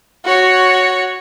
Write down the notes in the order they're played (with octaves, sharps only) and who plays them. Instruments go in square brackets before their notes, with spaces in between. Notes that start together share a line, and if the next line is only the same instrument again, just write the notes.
[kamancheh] F#4 C#5